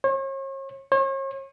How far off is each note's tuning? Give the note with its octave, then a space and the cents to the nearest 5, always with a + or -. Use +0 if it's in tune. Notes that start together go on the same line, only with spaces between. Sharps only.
C#5 -40
C#5 -40